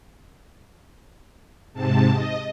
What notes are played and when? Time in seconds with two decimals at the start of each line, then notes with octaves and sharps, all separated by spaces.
1.73 G#2 C3 A5
2.12 D#5